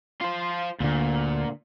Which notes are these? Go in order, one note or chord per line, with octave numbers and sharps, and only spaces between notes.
F4 C5
D2 A#2 D3